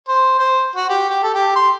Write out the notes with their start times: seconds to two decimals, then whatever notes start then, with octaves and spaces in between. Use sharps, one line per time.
0.08 C5
0.39 C5
0.76 F#4
0.89 G4
1.09 G4
1.23 A4
1.34 G4
1.55 C6